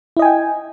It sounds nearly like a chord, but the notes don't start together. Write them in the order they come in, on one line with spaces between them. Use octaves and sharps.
E4 D#5 G#5 G5